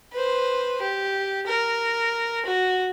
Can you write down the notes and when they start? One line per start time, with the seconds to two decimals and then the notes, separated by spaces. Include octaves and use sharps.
0.13 B4 C5
0.82 G4
1.47 A#4
2.46 F#4